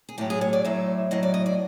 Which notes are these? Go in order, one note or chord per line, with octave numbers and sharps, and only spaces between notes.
G#4
A2 F#3 G4
G#4
C#5
D5
A2 F#3 E5
A2 F#3 D#5
D5
D#5
D5